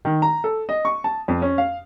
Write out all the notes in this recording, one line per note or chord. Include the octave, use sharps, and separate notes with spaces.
D#3
A#5
A4
D#5
C#6
A5
F2
C#4
F5